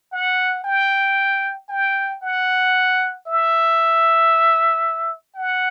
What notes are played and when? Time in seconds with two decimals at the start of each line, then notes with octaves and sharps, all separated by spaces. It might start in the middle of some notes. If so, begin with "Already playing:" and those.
0.12 F#5
0.64 G5
1.69 G5
2.22 F#5
3.27 E5
5.35 F#5